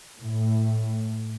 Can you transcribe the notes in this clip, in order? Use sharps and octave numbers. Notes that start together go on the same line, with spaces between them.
A2